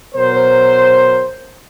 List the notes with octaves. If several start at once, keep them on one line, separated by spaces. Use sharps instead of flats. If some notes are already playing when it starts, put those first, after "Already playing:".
B2 F#3 A#4 C5